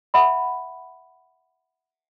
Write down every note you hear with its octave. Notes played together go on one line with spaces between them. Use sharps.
E5 F#5 B5